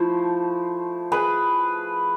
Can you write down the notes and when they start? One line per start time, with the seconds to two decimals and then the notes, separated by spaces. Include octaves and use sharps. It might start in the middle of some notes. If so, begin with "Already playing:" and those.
Already playing: F3 A3 E4 C5
1.12 G#4 B4